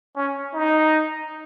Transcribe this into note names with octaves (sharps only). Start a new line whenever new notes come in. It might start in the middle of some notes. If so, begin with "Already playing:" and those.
C#4
D#4